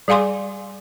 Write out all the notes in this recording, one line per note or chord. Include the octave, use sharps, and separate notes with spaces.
G3 G#4 F5 G#5 C6 D6